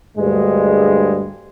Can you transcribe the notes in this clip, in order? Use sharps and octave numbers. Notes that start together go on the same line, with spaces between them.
D2 G2 G#3